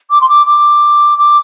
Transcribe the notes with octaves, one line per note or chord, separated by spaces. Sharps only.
D6
C6
D6
D6
D6